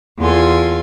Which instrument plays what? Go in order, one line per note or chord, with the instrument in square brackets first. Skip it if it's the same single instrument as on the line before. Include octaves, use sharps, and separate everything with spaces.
[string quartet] E2 F4 A4 G#5 C6